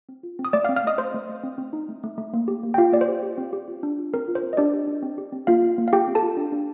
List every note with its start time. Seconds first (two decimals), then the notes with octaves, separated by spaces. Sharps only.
0.09 C4
0.23 F4
0.39 C4
0.45 D#6
0.53 A3 D5 D6
0.64 F5 F6
0.69 C4
0.76 F5 F6
0.84 A3 D#5 D#6
0.98 A3 C5 C6
1.14 A3
1.29 A3
1.44 C4
1.58 C4
1.73 D#4
1.89 A3
2.03 A3
2.18 A3
2.34 A#3
2.48 G4
2.63 A#3
2.74 G5
2.78 F4 G4 F5
2.93 A#3 D5
3.01 C5
3.08 G4
3.23 G4
3.38 C4
3.53 G4
3.68 F4
3.83 D4
3.98 F4
4.14 C4 A#4
4.28 F4
4.35 C5
4.43 C4
4.53 D#5
4.57 D4 G4 D5
4.73 G4
4.88 D4
5.03 C4
5.18 G4
5.32 C4
5.47 A#3 F4 F5
5.63 F4
5.78 A#3
5.88 F5
5.93 F4 G4 G5
6.07 C4
6.15 A4 A5
6.23 F4
6.37 D4
6.52 D4